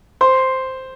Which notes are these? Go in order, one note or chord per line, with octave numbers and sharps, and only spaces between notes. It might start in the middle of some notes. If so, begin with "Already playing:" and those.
C5 C6